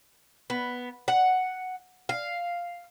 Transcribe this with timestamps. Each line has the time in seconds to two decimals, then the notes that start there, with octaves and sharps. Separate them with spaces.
0.50 B3
1.08 F#5
2.09 F5